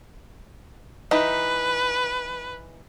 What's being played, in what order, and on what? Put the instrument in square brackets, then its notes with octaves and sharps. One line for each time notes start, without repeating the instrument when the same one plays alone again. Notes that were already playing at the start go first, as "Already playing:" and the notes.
[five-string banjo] E3 D#4 [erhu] B4